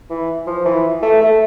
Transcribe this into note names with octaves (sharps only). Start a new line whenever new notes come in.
E3
F3
E3
A3
A3